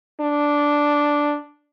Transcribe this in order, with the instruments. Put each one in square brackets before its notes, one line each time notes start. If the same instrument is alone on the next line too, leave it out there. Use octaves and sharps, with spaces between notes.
[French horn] D4